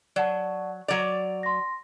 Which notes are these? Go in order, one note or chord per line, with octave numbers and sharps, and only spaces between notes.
F#3 D5 F#5 A5
F#3 D5 F7
C6 A#6